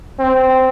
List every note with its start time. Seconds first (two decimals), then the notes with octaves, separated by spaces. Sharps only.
0.19 C4